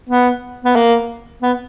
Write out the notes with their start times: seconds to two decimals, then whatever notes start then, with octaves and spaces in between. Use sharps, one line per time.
0.09 B3
0.65 B3
0.76 A#3
1.42 B3